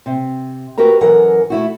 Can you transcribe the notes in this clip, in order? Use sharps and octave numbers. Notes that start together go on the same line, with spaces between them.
C3
F#4 G4 A#4 B4 A#5
F#2 E3 A4 A#4 F#5
A3 E4 F#4